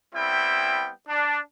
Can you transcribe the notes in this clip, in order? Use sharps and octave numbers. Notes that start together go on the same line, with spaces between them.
G3 B3 C4 E4 G5
D4